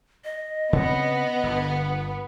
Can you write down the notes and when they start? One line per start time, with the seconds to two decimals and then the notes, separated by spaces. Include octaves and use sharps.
0.25 D#5
0.73 C#3 B3 C4
1.43 G1 D3